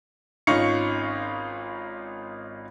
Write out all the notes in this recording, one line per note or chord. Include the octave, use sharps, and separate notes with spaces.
G#1 C#4 D#4 F4 C#6 C#7